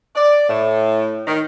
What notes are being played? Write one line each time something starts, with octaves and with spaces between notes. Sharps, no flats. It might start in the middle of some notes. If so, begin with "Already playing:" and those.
D5
A2
D#3